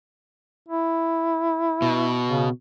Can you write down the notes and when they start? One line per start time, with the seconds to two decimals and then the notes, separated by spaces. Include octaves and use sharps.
0.69 E4
1.82 B2
2.27 C#3